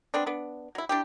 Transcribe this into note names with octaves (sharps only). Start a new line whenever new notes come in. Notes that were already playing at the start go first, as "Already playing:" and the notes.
B3 C4 D4
B3 D4
F#3 E4
D4 E4 G4